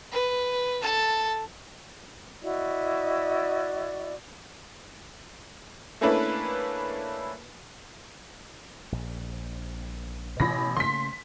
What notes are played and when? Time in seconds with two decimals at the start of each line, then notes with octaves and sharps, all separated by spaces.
0.12 B4
0.82 A4 A5
2.41 E4 F#4 D5 D#5
6.01 A3 A#3 C#4 D4 E4 B4
8.92 A#1
10.40 A1 B2 B5 A#6
10.77 C#3 A3 A#3 C6 B6